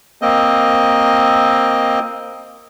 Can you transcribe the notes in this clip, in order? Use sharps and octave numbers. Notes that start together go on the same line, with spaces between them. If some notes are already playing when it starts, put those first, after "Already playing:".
A#3 C4 D#5